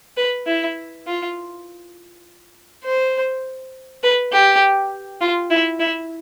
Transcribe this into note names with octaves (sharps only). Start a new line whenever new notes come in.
B4
E4
F4
C5
B4
G4
F4
E4
E4